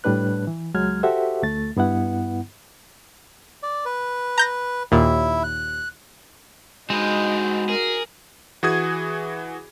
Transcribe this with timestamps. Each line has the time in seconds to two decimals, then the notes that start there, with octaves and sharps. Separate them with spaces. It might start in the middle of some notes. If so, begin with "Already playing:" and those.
0.04 A2 G3 D4 B4 F#6
0.47 E3
0.74 C#2 F#3 G#3 F6 G#6
1.03 F#4 G4 A4 C5 E5 F#5
1.43 D2 A3 A6
1.77 G2 B3 E4 F#5
3.63 D5
3.86 B4
4.38 A#5 G6 A#6
4.92 D#2 A#2 E4 E5
5.44 F#6
6.90 G#3 C4 D#4 F#4 B4
7.69 G#4 A#4
8.63 E3 F#4 G#4 D#6 G#6